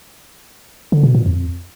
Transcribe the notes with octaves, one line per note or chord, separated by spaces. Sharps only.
D3
B2
A#2
F2